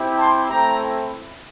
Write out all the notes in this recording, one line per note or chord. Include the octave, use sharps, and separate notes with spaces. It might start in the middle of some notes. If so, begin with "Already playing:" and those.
Already playing: C4 E4 G4
A5 C6
A3 C4 E4 G5 A#5